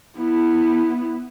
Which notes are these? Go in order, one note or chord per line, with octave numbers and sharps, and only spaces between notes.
B3 E4